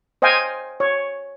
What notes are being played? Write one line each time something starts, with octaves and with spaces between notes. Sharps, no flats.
C5 D#5 F5 G5 G#5
C#5